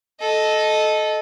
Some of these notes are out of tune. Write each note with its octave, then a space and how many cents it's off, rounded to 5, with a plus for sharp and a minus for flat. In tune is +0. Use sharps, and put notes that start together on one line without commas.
A4 -15 D#5 +0